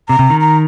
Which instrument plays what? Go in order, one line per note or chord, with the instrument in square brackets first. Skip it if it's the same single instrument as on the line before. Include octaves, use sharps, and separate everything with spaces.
[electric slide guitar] C3 [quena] A#5
[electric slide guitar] C3
D#3
[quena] A#5